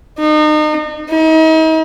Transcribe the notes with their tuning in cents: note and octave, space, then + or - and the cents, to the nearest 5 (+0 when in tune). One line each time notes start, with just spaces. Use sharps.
D#4 -35
D#4 +40